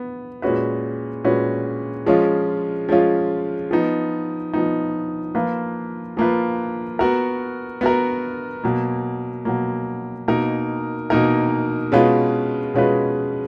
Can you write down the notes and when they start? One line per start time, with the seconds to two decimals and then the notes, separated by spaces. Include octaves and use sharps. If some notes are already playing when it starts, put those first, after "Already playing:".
Already playing: B3
0.42 A#2 G#3 C#4 F#4 B4
1.24 A#2 G#3 C#4 F#4 B4
2.06 F3 G#3 C#4 F4
2.89 F3 G#3 C#4 F4
3.71 F3 B3 D#4
4.53 F3 B3 D#4
5.35 F3 A#3 F4 B4
6.17 F3 A#3 F4 B4
6.99 B3 F#4 A#4
7.81 B3 F#4 A#4
8.64 B2 F#3 A#3
9.45 B2 F#3 A#3
10.28 B2 A#3 D#4 A#4
11.10 B2 A#3 D#4 A#4
11.92 B2 G#3 C#4 F4 B4
12.74 B2 G#3 C#4 F4 B4